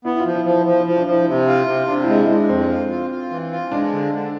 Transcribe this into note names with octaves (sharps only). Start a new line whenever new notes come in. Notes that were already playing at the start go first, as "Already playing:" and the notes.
B3 E4
E4
F3 F4
E4
F3
E4
F3
E4
F3
D4
F3
E4
C3
F4
C3
C3 D4
G#3 E4
E4
G#3 D4
F2 C4
F4
F4
F4
E3
F4
G#3 D4
D3
D3